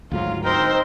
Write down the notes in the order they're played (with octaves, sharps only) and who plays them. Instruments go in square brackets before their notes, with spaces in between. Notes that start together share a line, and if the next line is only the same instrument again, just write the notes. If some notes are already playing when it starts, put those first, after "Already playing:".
[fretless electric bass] D2 G#2 F#3 [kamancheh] F4
[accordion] C4 D#4 [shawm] A#4 [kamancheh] C5 G5